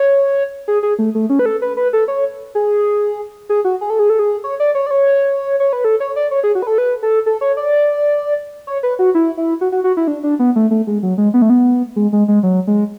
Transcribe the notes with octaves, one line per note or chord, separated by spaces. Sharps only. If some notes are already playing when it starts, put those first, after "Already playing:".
Already playing: C#5
G#4
G#4
A3
A3
C#4
B4
A4
B4
B4
A4
C#5
G#4
G#4
F#4
G#4
A4
G#4
A4
G#4
C#5
D5
C#5
D5
C#5
C#5
B4
A4
C#5
D5
C#5
G#4
F#4
B4
A4
B4
A4
A4
C#5
D5
C#5
B4
F#4
E4
E4
F#4
F#4
F#4
E4
D4
D4
B3
A3
A3
G#3
F#3
G#3
B3
A3
B3
G#3
G#3
G#3
F#3
G#3